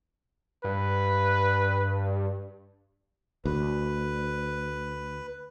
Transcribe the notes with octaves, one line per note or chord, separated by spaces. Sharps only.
G2 B4
D2 B4